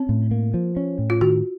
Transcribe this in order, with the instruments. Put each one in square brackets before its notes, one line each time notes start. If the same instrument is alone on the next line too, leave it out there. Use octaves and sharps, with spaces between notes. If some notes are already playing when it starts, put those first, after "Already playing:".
Already playing: [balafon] C4 [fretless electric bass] C#4
[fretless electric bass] A2
A#3
F3
C#4
A2
[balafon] F4
[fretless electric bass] D#3 [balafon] F#4